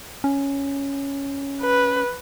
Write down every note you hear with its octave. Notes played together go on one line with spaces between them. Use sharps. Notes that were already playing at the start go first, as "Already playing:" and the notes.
C#4
B4